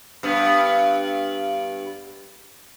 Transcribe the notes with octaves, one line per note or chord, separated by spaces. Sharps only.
G2 B3